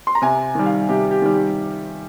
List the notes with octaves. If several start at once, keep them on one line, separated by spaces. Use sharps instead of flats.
C6
A#5
C3 G#5
D#3 G3
F5
C3 G4
G4
D#3 G3
G4